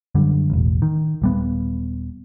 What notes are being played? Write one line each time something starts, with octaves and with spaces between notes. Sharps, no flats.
F#2 D3 G3
E1 A1
D#3
D#1 G3 B3